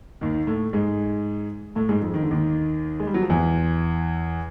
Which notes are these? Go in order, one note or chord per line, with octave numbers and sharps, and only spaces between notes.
D#2 D#3
A2 A3
G#2 G#3
A2 A3
G#2 G#3
F2 F3
D#3
D3
D#2 D#3
G#3
G3
F#3
F3
E2 E3